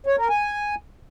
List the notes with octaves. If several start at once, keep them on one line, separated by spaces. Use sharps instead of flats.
C#5
A#4
G#5